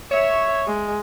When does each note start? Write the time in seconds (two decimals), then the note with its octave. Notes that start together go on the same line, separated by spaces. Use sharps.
0.11 C#5 E5
0.67 G#3